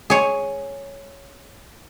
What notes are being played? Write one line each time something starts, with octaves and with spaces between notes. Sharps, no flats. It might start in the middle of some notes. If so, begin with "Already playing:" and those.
G#4 C#5